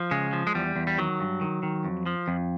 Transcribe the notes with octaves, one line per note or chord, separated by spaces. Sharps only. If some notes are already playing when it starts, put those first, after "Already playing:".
Already playing: F3
C#3 G#3
F3
G#3
E2 G3
E2
G3
D#3 F#3
G2
D#3
D#3
F2
F3
F2